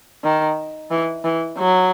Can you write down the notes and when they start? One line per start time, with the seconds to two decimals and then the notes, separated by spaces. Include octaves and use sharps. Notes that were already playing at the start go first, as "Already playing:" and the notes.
0.24 D#3
0.91 E3
1.24 E3
1.58 F#3